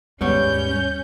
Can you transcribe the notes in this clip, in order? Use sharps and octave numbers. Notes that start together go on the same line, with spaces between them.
D#2 G#2 G3 G#3 B3 C#4 C#5 G6